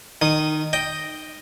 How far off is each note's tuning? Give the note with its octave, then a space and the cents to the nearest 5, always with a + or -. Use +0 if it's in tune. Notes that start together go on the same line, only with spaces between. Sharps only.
D#3 -15 D#6 +0
D#5 +0 G5 +0